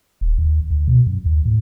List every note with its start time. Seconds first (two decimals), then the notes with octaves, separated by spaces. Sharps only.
0.21 D#1
0.38 D#2
0.70 D2
0.88 B2
1.06 F#2
1.26 D#2
1.45 A2